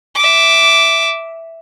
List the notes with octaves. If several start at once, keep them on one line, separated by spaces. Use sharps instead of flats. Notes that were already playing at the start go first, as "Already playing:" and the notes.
E5 D6